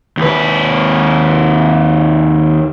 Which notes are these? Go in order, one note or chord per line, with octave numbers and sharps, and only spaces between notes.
D#2 B4